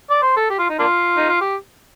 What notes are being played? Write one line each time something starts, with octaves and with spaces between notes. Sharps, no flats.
D5
C5
A4
G4
F4
D#4
A#3 D4 F4
D#4
F4
G4